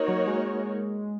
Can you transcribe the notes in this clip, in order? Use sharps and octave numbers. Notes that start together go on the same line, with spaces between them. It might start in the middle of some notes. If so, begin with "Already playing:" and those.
Already playing: A#3 D#4 F#4 A#4 C#5
F#3
G#3